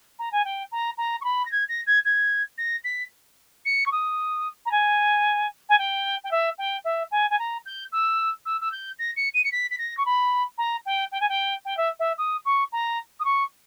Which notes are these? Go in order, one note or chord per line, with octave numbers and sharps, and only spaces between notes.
A#5
G#5
G5
A#5
A#5
C#6
B5
A#6
G#6
A#6
G#6
G#6
A#6
B6
C#7
C#6
D#6
A#5
G#5
G#5
G5
G5
E5
G5
E5
G#5
G#5
A#5
G6
E6
E6
E6
G6
A#6
C#7
D#7
C#7
B6
B6
A#6
C#6
B5
A#5
G5
G5
G#5
G5
G5
E5
E5
D#6
C#6
A#5
D#6
C#6